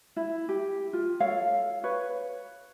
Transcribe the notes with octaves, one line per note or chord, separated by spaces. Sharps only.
E4
G4
F4
A4 C#5 F5
B4 C#5